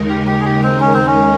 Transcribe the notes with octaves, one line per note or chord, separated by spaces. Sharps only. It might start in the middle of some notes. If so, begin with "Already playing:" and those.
Already playing: D#2 C#3 G#3 D#4 A#4
G4
G4
G#4
G4
C4
C#4
C4
C#4